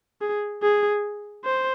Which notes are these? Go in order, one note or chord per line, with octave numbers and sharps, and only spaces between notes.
G#4
G#4
C5